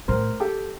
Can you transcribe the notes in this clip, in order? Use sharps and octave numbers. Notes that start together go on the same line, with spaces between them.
A2 A#4 C5
G4 A4